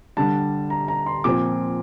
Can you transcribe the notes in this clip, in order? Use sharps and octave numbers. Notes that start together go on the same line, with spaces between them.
D3 G3 D4 A5
A#5
A#5
C6
A#2 F3 C4 D6